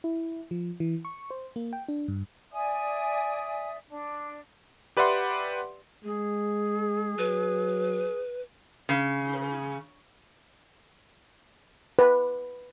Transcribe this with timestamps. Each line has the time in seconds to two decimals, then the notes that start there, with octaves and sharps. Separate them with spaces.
0.04 E4
0.51 F3
0.80 E3
1.05 C#6
1.30 C5
1.56 A#3
1.73 G5
1.88 D4
2.08 G2
2.52 D5 E5 G#5 D#6
3.88 D4
4.97 G4 B4 D5 E5 F#5 C6
6.04 G#3 G#4
7.18 F#3 B4
8.89 C#3
11.99 B4